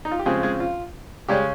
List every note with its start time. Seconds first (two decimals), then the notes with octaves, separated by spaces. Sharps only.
0.05 D#4
0.11 F4
0.19 G4
0.26 C#3 F3 G#3 C4 G#4
0.43 G#3 G#4
0.60 F4
1.28 C#3 G3 G#3 C#4 G4